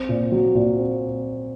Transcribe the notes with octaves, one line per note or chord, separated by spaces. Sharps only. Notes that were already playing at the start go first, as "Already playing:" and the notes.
Already playing: C4
A#2
F#3
A#2
C4